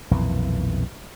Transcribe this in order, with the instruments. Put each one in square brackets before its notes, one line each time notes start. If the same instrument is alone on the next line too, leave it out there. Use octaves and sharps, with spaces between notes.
[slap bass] B1 F2 A#2 E3